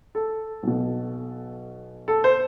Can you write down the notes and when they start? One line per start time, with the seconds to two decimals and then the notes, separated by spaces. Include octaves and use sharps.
0.15 A4
0.63 B1 B2
2.08 A4
2.24 C5